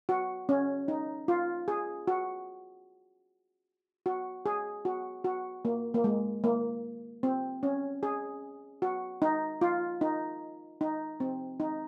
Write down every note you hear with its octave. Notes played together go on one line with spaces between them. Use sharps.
F#4
C#4
D#4
F4
G#4
F#4
F#4
G#4
F#4
F#4
A#3
A#3
G#3
A#3
C4
C#4
G#4
F#4
D#4
F4
D#4
D#4
C4
D#4